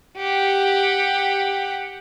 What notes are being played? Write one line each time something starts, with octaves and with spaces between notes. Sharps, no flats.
G4 F#5